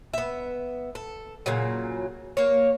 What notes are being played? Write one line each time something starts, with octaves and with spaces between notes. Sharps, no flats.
B3 E5
A4
A#2 C#3 F#3
A#3 C#5